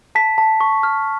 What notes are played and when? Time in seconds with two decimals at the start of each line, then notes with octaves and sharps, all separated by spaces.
0.15 A5 B6
0.38 A5
0.61 C#6
0.83 F6